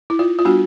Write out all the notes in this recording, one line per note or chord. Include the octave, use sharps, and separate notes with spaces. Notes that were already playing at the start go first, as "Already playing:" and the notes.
E4
F4
F4
G3 B3 D4 F#4